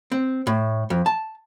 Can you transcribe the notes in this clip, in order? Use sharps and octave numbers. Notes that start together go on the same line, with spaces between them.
C4
A2
F2
A5